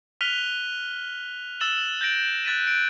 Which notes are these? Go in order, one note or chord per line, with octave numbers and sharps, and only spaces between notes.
F6 F#6 B6 D#7 F7 G7
E6 A6 E7 F#7 G7
G6 A6 A#6 D7 F#7
F#6 A6 B6 D#7
D7